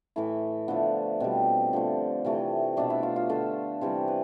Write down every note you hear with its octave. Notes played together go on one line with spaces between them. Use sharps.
A2 E3 A3 E4
D3 F3 A3 B3
B2 G3 C4
D3 F3 A3
C3 E3 A3
B2 A3 D4
E4
F4
F4
D3 A3 A4
C3 E3 G3 C5
B4